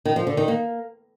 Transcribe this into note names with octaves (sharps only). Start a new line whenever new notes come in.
D#3
F3
D3
D#3
A#3